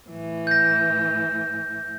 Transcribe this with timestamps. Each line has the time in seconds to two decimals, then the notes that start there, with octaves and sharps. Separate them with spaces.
0.10 A2 E3
0.47 G6 A#6